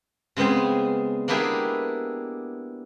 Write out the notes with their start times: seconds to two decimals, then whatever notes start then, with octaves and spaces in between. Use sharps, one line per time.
0.36 C#3 G#3 B3 C4 G#4
1.28 A#3 B3 D4 E4 G4 G#4